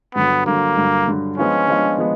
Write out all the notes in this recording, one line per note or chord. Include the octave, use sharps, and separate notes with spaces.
G2 D3 F#3 B3
G2 D3 F#3 A#3
G2 D3 F#3
G2 D3 F#3
F3 G#3 B3 C#4 D4 F4
F3 G#3 B3 D4 F4
F3 G#3 B3